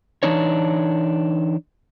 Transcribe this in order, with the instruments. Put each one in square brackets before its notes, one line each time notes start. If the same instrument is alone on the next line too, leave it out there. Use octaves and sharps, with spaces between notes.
[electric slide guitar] E3 D4 D#4 C#5